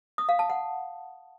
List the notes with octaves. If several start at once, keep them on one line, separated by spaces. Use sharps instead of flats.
D#6
F5
A5
F#5